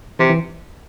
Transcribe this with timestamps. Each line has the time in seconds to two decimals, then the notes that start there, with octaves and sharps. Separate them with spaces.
0.19 C3 E3
0.30 E3